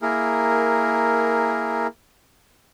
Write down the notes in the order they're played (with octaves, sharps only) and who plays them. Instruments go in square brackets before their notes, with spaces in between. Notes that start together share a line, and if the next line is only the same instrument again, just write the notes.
[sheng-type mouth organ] A#3 E4 G#4 A#4